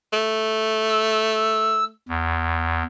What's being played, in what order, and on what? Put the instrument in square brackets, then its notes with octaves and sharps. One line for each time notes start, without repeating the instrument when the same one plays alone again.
[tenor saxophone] A3
[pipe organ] E6
E2